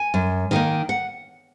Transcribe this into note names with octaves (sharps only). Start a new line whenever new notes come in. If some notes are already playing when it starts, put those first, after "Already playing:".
Already playing: G#5
F#2
D#3 A#3 D#4
F#5